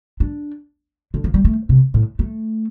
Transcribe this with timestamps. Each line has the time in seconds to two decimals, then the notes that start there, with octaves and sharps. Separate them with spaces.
0.20 D4
1.14 D3
1.24 F3
1.34 G3
1.45 A3
1.69 C3
1.94 A2
2.19 A3